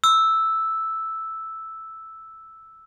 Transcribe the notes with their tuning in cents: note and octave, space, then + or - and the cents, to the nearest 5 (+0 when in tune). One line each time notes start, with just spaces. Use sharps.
E6 -5